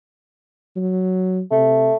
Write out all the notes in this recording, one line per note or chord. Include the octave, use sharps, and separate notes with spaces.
F#3
C3 A3